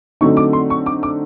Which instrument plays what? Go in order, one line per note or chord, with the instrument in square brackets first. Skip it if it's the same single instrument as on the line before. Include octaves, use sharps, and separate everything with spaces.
[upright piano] D3 F#3 A3 C4 D#4 C#6
D6
C6
C#6
D6
D6